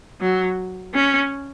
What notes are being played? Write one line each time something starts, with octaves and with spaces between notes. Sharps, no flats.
F#3
C#4